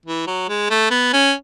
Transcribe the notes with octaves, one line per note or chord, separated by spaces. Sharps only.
E3
F#3
G#3
A3
B3
C#4